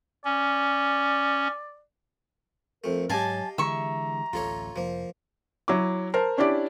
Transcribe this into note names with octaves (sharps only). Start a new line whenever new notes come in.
C#4 D5
F2 A3 A#4
G#2 F#3 G4 D#5 F5 G#5 A5
D3 E3 G#3 E5 A#5 C#6
D1 A1 F4 A4 C#5
F1 F3 A#3
F#3 E4 D6
A#4 C5 A5
C#4 D4 E4 G4 D5